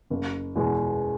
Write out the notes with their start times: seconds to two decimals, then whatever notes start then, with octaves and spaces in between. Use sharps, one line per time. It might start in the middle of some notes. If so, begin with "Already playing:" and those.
0.10 F#1
0.56 E2 B2 G#3